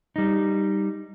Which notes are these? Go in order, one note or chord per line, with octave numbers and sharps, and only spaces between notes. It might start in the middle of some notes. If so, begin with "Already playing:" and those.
G3 D#4